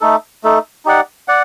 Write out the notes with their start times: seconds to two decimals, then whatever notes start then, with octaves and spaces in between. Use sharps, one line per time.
0.01 A3 D#4 A4
0.44 A3 D#4 A4
0.85 D#4 G4 D5 F#5
1.28 D5 F#5